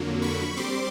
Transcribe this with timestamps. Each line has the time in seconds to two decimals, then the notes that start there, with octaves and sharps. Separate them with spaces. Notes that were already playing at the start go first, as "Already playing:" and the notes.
Already playing: F2 D3 F#3 A#3
0.22 B5 C#6
0.57 G3 C4 C6 D6